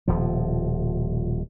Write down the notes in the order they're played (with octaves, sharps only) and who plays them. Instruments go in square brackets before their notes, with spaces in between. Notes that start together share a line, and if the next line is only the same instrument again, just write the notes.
[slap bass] D#1 B2 F3